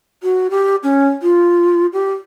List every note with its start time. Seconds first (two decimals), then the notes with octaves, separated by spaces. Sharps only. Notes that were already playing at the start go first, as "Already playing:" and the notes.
0.23 F#4
0.50 G4
0.83 C#4
1.22 F4
1.93 G4